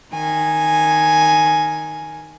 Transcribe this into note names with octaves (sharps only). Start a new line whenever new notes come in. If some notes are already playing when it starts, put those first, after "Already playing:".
D#3 G#5